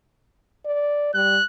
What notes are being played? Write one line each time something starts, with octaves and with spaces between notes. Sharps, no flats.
D5
G3 F#6